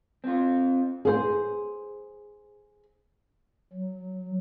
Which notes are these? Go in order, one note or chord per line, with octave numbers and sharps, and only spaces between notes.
C4 F4
G#4 C5
F#3